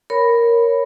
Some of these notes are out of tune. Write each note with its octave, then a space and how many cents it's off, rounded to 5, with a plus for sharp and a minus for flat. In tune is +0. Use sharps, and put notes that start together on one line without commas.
A#4 +0 C#5 +0 B5 +0